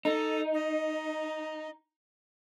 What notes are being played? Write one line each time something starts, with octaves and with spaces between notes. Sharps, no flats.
D#4 A4
D#5